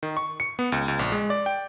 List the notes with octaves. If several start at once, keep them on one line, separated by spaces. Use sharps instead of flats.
D#3
C#6
C#7
B3
C#2
C#2
A#1
G#3
D5
G5